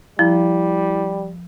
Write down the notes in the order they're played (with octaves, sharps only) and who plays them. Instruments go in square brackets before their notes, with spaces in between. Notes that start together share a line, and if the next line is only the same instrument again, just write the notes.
[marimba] F3 [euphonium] G3 [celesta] E4